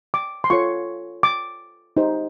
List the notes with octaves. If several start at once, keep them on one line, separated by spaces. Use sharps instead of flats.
D6
C6
F4 A4 C#5 C#6
D6
D#4 G4 C5